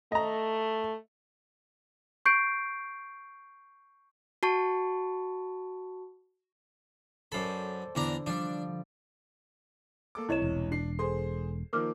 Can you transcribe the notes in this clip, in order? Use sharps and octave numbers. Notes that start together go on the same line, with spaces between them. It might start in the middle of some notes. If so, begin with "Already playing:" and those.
A3 D#5 A#5
C#6 G6 C7 D7
F#4 A5 C#6
F#2 A4 C5 D5 B5
E2 D3 D4 A#5
F3 G3 D4
A#3 A4 D6
C2 E4 C#5 D#5 E7
E1
D4 C7
G#4 A4 C5 C6
D#3 F3 A#3 A#4 D6 F6